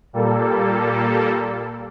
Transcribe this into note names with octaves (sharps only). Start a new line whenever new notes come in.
A#2 G3 A#3 A4